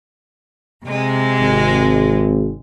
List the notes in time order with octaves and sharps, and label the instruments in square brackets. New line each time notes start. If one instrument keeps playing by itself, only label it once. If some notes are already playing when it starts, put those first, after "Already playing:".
[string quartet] C3 G#3
[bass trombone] G#1